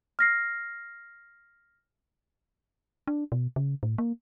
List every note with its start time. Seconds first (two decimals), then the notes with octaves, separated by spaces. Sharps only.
0.19 F6 A#6 C7
3.07 D4
3.32 B2
3.56 C#3
3.83 A2
3.98 A#3